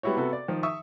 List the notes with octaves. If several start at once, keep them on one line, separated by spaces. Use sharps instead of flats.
G3 B3 E4 F#4 C#5
C3 B3 F#4 A4
D5
D#3 F3
E5 C#6 D#6 E6